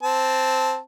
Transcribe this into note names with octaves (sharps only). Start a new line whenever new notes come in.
C4 A5